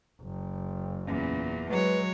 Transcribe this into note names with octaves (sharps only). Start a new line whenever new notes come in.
F#1
E2 A#2 C#4
F#3 G#3 B4 C#5